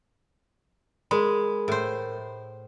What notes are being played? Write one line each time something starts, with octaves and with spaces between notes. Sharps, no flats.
G#3 A#4 B5
A2 C5